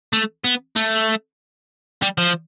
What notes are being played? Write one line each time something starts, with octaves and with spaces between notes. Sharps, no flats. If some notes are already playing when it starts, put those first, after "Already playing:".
A3
B3
A3
G3
F3